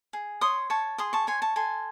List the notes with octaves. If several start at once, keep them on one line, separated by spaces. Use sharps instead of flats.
G#4
C#5 C6 D#6
C#5 A5 C#6
G#4 C6 D#6
A5 C#6
C#5 G#5 C6
A5 C#6
A4 G#5 C6